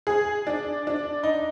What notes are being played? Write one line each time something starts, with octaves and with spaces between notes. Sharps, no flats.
G#4
D4
D4
D#4